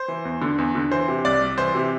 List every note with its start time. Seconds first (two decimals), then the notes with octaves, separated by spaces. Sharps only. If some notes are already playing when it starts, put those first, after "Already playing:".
Already playing: C5
0.08 E3
0.25 E2
0.42 D3
0.58 E2
0.75 D3
0.91 E3 C5
1.08 C3
1.25 C2 D5
1.41 C2
1.58 E3 C5
1.75 C3